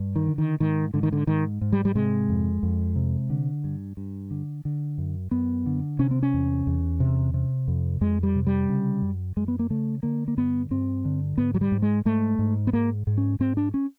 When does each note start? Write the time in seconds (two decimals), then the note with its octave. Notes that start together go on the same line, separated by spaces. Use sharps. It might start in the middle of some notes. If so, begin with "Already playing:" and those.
Already playing: G2
0.16 D#3
0.27 D3
0.38 D#3
0.60 G#2 D#3
0.94 G#2 D3
1.03 D#3
1.12 D3
1.27 G#2 D#3
1.61 G#2
1.72 G3
1.85 G3
1.95 C3 G#3
2.29 F2
2.63 F2
2.96 C3
3.30 D3
3.64 G2
3.97 G2
4.31 D3
4.65 D3
4.98 F#2
5.31 F#2 B3
5.66 D3
5.99 C3 C#4
6.11 C4
6.23 C#4
6.34 E2
6.67 E2
7.00 C3
7.34 C3
7.68 F2
8.01 F2 G#3
8.23 G3
8.36 C3
8.47 G3
8.69 C#3
9.02 F#2
9.37 F#2 G#3
9.48 B3
9.59 A#3
9.70 C#3 A3
10.03 D3 A#3
10.28 A#3
10.37 G2 B3
10.71 G2 C4
11.05 D3
11.38 G#2 B3
11.54 F#3
11.61 G3
11.72 G#2
11.82 G#3
12.05 G#2 A3
12.39 G#2
12.67 B3
12.73 G#2 A#3
13.07 G#2
13.18 C#4
13.40 G#2 C4
13.57 D4
13.74 C#4